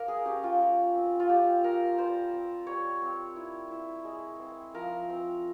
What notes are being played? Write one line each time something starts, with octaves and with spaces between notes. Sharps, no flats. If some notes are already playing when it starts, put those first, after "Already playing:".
Already playing: A#3 A#4
G#4
C#4 G4
F4
G3
C4
F4
G3 G4
A#3 A#4
G3 C5
C4
G3 C#5
C4
E4
E4
G#3
C4
F3 A#4
C4